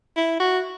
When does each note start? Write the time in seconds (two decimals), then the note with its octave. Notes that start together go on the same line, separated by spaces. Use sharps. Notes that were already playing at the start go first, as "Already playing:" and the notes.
0.16 E4
0.40 F#4